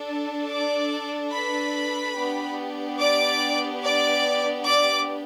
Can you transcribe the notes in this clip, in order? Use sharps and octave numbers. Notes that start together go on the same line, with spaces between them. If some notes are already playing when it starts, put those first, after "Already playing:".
Already playing: D4 A4
D5 D6
B4 B5
B3 D4 G4
D5 D6
D5 D6
D5 D6